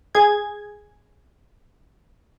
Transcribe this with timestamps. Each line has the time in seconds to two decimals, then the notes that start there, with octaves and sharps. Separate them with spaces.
0.15 G#4 G#6